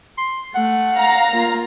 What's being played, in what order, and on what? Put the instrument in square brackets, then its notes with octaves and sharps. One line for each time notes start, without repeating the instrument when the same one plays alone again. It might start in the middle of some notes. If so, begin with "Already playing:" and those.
[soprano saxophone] C6
[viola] A3 [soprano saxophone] F#5
[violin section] F5 A#5
[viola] A#3 F4